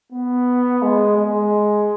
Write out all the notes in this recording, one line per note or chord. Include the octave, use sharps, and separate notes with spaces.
B3
G#3
G#3